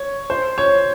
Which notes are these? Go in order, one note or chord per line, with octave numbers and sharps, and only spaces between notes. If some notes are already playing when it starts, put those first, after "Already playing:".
Already playing: C#5
C5
C#5